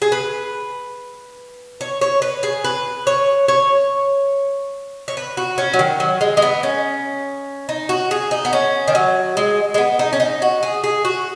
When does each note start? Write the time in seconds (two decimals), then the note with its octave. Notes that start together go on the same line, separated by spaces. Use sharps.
0.02 G#4
0.12 B4
1.81 C#5
2.01 C#5
2.22 B4
2.43 G#4
2.64 B4
3.07 C#5
3.48 C#5
5.08 C#5
5.17 B4
5.37 F#4
5.58 C#4
5.73 F#3
5.79 D#3
6.00 F#3
6.21 G#3
6.37 G#3
6.42 B3
6.63 C#4
7.69 D#4
7.89 F#4
8.11 G#4
8.31 D#4
8.45 B3
8.53 C#4
8.88 D#3
8.95 F#3
9.37 G#3
9.74 G#3
9.78 B3
9.99 D#4
10.13 C#4
10.20 D#4
10.42 F#4
10.63 G#4
10.84 G#4
11.05 F#4